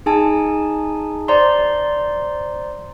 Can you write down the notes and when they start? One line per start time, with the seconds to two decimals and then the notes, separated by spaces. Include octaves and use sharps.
0.06 D#4 G#4 G#5 A5
1.28 C5 D5 A#5 C6